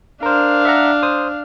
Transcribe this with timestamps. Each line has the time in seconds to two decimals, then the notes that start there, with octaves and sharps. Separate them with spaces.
0.23 D4 A#4 C5 F5
0.65 E5 F#5 A#5
1.03 C5 D#6